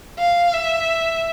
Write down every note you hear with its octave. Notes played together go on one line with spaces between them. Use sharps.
F5
E5